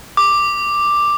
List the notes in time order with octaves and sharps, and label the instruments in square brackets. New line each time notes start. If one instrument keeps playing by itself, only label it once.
[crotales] D6